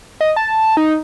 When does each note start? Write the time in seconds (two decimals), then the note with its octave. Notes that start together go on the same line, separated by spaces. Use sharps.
0.21 D#5
0.36 A5
0.77 D#4